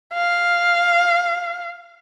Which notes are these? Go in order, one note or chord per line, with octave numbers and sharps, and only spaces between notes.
F5